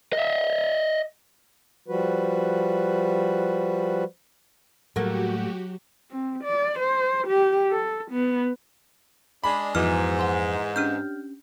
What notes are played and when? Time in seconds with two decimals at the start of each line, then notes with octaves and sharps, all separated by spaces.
0.13 D#5 E5
1.88 F3 G3 F#4 B4
4.96 A2 F#3 G3 A3 A#3 F#4 G4
6.11 C4
6.44 D5
6.79 C5
7.27 G4
7.71 A4
8.11 B3
9.44 G#3 D4 B5
9.75 F2 G#2 E3 F3 B3 F#4 D6 F6
10.19 F#5 C6
10.76 C#4 D4 G4 F6 G6